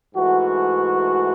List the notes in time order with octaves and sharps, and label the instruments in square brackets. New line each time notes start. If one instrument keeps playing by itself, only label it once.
[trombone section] G#2 E3 A3 F#4